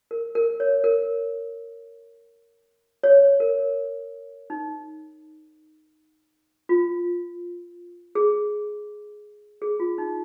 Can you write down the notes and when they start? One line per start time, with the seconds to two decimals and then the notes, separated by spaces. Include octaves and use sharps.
0.11 A#4
0.35 A#4
0.60 C#5
0.84 A#4
3.03 C#5
3.40 A#4
4.50 D#4
6.69 F4
8.15 G#4
9.62 G#4
9.80 F4
9.98 D#4